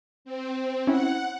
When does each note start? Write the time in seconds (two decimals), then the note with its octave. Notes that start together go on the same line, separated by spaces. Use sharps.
0.25 C4
0.87 C#4 E4 F#5